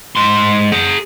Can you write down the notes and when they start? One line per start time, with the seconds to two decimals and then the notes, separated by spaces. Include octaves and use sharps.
0.16 G#2 C6
0.72 G#4 F#5